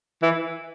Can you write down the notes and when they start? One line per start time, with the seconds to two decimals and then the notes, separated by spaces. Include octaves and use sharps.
0.23 E3